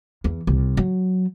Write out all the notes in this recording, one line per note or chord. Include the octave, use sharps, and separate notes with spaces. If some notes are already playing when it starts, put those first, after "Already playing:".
E2
C2
F#3